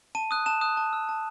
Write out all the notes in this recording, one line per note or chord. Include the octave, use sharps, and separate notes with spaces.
A5 D#7
D#6 F#6
A5 E7
D#6 F#6
A5
E6
A5